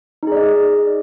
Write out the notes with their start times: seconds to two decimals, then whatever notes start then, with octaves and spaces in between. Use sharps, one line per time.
0.23 D#4
0.27 G#4
0.32 D5
0.36 D#5